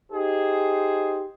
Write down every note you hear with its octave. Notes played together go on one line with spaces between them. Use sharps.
D#4 G4 G#4 C5